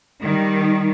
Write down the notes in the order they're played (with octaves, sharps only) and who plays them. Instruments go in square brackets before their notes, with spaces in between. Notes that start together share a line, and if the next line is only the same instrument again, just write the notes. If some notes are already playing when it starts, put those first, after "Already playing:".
[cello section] D#3 G3